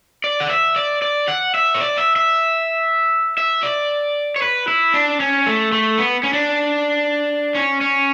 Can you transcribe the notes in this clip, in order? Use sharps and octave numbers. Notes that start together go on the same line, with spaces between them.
D5
F#5
E5
D5
D5
F#5
E5
C#5
D5
E5
E5
E5
D5
C#5
B4
E4
D4
C#4
A3
A3
B3
C#4
D4
C#4
C#4